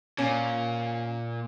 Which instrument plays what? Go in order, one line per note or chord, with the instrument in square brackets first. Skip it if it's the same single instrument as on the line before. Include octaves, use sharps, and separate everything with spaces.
[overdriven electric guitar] A#2 [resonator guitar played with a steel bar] C#4